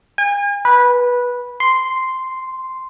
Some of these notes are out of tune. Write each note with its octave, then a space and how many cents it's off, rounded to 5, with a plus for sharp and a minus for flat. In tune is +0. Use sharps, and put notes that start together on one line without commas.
G#5 -40
B4 -15
C6 -5